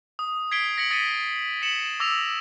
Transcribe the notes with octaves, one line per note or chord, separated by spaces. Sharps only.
D#6
G#6 B6 C7 D7 G7
A#6 B6 C#7 F#7
D#6 A6 B6 C#7 D#7
B6 C#7 E7 F#7
D6 E6 A#6 F7